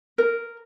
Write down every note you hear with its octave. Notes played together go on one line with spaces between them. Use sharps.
A#4